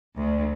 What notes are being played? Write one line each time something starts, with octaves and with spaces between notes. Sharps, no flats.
D2